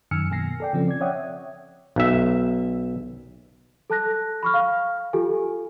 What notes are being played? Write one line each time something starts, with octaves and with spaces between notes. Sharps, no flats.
F#2 D#3 G#5 E6 F6 C#7
B2 A#3 G#5 A#6 C7
A4 D5 G5
C#3 F3 C4 C#4
D5 G#6
C#5 D5 E5 F#5 G5 D#6
B1 E5
A4 A5 F#6 A#6
B5 C#6 F6
F5
F4 G4 A4 G#5